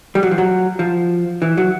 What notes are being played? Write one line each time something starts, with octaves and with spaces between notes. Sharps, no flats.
G3
F#3
F3
F#3
F3
E3
F#3